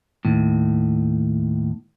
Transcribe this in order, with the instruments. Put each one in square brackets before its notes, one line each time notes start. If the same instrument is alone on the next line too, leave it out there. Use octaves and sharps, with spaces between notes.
[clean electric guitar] D#2 A2